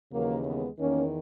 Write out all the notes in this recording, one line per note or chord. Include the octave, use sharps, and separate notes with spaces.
D#2 C#3 E3 F#3 A#3
G#3 B3
E2 D#3 A#3 C#4